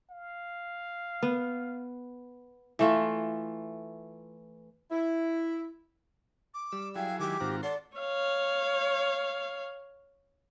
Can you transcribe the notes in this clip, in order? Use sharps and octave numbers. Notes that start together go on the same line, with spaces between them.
F5
B3
E3 A3 F4
E4
D6
G3 E6
F#3 E4 G#4 F5 G5
D#3 G#3 G4 D6
G#2 D#3 C4 F4 F#4 A#5
A4 D5 F#5 C6
C#5 F5